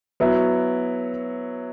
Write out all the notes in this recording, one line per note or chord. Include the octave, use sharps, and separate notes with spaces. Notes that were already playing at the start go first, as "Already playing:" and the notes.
F#3 B3 E4